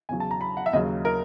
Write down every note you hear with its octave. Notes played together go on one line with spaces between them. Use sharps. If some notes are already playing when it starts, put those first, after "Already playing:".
E2 C#3 F#3 G#5
A5
A#5
B5
F#5
E5
D#2 C#3 F#3 D#5
A#4